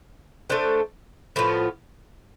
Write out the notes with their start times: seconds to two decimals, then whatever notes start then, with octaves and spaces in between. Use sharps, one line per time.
0.50 A3 D4 A4 C5
1.36 A2 F3 B3 F4